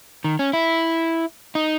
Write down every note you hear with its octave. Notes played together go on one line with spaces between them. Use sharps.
D#3
C#4
E4
D#4